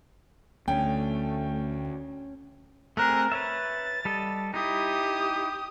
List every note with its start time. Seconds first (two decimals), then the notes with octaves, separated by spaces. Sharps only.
0.68 D2 A3 C#4 G5
2.97 A3 C4 G#4 A#4 F#6
3.32 B4 C#5 E5 A6
4.05 G3 A4 D#5
4.54 D#4 E4 G4 D#6